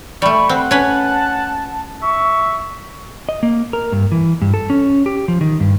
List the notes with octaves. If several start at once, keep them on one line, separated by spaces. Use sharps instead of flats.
G3 A3 B5 C#6
C4 F#5
C#4 B4 A5
E5 C#6
D#5
A#3
A#4
G2
E3
G2
A4
C#4
G4
F3
D#3
G2